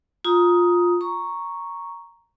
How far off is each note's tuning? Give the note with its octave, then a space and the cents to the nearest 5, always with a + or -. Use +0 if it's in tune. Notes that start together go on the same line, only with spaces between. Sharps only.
F4 +10 A#5 +15 D#6 +10
A#5 +0 C#6 +0